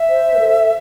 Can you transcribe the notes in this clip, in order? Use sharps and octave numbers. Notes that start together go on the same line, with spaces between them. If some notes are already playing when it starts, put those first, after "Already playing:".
Already playing: E5
C5
B4
A4